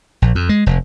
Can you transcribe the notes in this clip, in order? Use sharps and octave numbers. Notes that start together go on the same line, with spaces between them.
A#1
F2
G#3
F1